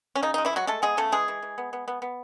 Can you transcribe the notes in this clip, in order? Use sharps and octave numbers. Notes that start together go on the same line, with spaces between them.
C#4
C#3 D#4
G#3 D#4
E3 E4
F#3 G#3 F#4
G#3 A3 A4
G#3 B3 G#4
C#3 A3 A4
E3 G#3 G#4
E3
E3
B3
B3
B3
B3